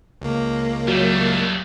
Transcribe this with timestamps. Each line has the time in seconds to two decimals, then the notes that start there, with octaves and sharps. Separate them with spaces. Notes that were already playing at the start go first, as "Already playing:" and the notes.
0.22 C#2 A#3
0.88 F#3 G3 A3